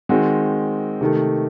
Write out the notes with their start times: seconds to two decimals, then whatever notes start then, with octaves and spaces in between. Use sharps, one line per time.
0.09 D#3 G#3 C4 F#4
1.01 C3 D#3 A3